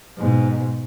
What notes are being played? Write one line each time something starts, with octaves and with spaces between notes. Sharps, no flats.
G#2 B2